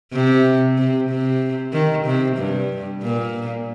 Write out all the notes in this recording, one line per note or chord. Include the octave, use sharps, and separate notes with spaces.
C3
C3
C3
D#3
C3
G2
A#2